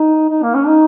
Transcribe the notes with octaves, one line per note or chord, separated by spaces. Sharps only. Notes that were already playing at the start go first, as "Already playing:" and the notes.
Already playing: D#4
D#4
A#3
C#4
D#4